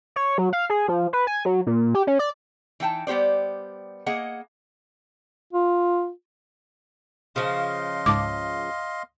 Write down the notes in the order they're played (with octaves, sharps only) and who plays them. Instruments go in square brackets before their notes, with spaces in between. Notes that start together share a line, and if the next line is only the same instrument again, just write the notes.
[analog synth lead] C#5
F#3
F5
G#4
F3
B4
G#5
F#3
A#2
G4
C#4
D5
[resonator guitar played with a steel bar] E3 D#4 G5 A5
G3 B3 G4 C5 D5
A#3 G#4 D#5 F#5
[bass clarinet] F4
[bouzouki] C#3 F3 [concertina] D#5 F5 C6
[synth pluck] C#2 G#2 A5 [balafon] D6